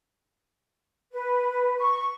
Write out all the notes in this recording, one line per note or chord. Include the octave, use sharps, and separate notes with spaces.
B4
C#6